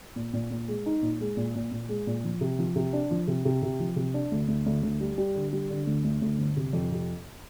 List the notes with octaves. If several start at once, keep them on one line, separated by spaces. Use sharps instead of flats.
A#2
A#2
A#2
G#3
D#4
A#2
G#3
A#2
A#2
A#2
G#3
A#2
F3
C3
F3
C3
D4
F3
C3
C3
C3
F3
C3
D4
D2
D2
D2
D2
G3
G3
D3
G3
D3
D2
D2
D2
G1
C3
F2
C3